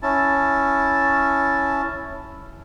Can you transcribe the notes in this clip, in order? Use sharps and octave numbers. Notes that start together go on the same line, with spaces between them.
C#4 E4 A5